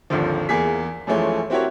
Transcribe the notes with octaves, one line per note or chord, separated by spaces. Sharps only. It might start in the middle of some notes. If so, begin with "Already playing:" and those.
G#1 D#2 D3 D#3 F3
E2 A#3 G#4 B6
F#2 E3 F3 G#3 A3 C#4
C4 E4 F#4 G4 A#4 C#5